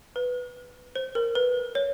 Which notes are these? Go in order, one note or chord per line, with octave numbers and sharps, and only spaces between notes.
B4
C5
A#4
B4
C#5